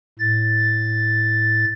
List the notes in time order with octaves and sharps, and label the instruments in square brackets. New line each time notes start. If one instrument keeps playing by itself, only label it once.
[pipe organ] A2 A6